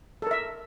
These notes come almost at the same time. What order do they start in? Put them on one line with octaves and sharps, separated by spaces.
A4 A#4 E5